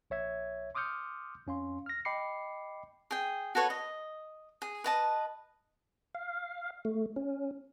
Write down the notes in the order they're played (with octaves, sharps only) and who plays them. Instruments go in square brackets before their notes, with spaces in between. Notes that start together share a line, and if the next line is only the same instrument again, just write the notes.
[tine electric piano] A#1 C#5 E5 G#6
C6 D6 D#6 F6 G6 C#7
F2 C#4 F5 C6
F6 A#6
D#5 G5 B5 D6 C7 C#7
[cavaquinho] G#4 G5
F#4 A4 B4 C#5
D#5
G#4
B4 D#5 A5
[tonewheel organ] F5
A3
C#4